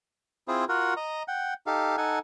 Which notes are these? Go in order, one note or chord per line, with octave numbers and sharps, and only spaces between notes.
C4 E4 F4 G#4 C5
F4 F#4 A#4 F#5
D#5 A#5
F#5 G5
D#4 G4 A4 F5
D#4 A4 F#5 G#5